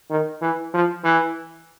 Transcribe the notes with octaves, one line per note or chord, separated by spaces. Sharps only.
D#3
E3
F3
E3